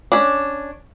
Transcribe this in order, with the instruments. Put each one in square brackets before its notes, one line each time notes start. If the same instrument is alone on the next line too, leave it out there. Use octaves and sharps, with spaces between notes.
[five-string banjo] C#4 D4